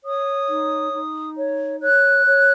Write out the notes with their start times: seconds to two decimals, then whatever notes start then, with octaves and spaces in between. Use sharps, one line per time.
0.04 C#5 D#6
0.47 D#4
0.92 D#4
1.36 C#5
1.80 C#5 F#6
2.26 C#5